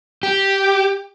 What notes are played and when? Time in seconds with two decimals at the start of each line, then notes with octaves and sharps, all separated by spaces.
0.23 G4